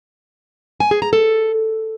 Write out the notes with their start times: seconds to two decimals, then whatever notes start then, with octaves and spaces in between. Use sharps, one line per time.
0.80 G#5
0.91 G#4
1.02 A#5
1.13 A4